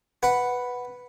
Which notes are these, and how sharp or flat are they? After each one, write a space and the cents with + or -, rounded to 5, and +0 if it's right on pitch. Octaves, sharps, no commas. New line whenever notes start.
B4 +0 F#5 +0